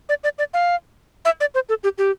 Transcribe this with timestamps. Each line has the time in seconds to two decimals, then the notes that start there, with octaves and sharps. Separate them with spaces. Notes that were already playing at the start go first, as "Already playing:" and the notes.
0.09 D5
0.24 D5
0.39 D5
0.54 F5
1.25 E5
1.40 D5
1.55 C5
1.69 A4
1.84 G4
1.98 G4